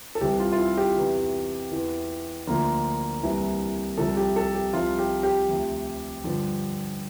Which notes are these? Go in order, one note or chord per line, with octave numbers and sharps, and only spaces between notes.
A4
C2 C3 E3 G4
F4
F4
E4
G4
E2 C3 E3
E2 E3
D2 D3 F3 A#3
C2 C3 E3
C2 C3 F3 A4
G4
A4
G4
C2 C3 F3 F4
G4
G4
D2 C3 F3
G2 D3 F3